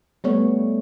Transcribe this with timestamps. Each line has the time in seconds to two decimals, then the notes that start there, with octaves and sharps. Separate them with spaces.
0.24 G3 A3 B3 C#5